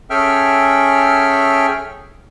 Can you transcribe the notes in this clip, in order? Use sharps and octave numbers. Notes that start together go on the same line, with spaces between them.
C#4 G#4 A4 E5 G5 F6